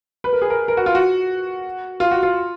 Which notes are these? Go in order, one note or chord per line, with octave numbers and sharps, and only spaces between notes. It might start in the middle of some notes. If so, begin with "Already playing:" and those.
B4
A#4
G#4
A#4
A#4
F#4
F4
F#4
F4
F#4
F4